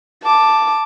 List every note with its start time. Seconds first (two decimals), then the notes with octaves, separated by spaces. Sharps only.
0.23 A5 D6